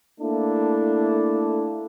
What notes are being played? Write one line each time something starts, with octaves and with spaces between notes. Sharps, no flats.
A3 A#3 D4 E4 A4